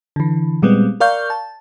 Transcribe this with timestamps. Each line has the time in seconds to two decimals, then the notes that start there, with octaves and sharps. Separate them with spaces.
0.16 D3 E3
0.62 A#2 G3 G#3 B3 C4
1.00 A#4 D5 F5 C#6 G6
1.30 A5